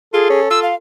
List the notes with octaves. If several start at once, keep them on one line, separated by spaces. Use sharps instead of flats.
F4 G#4 A4
C#4
F4 E6
F5